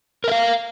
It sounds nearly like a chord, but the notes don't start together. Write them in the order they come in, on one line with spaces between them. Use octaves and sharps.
A#4 E5 F5